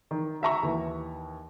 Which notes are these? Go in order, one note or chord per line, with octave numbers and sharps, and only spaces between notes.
D#3
F#4 E5 A#5 C#6
D#2 E3